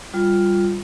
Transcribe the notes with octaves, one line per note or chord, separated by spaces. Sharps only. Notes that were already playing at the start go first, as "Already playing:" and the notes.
G3 F4